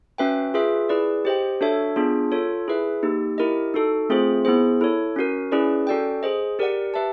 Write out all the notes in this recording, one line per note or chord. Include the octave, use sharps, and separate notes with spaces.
C#4 F#4 B4 E5 G5
F4 G#4 B4 E5
E4 G#4 B4 D5
G4 C5 D#5 G5
D4 F#4 A4 C#5 E5
B3 D4 F4 G#4
F4 A4 C#5
E4 G#4 B4 E5
A#3 D#4 G4
E4 G4 A#4 D#5
D#4 F#4 A4
A3 C4 F4 G#4 C5
B3 E4 G#4 C5
E4 A4 C#5
C#4 F#4 A#4
C#4 E4 G#4 B4 D5
C#4 F#4 A4 D5 G5
G#4 C5 D#5
G4 A#4 D5 F#5
G4 B4 E5 A5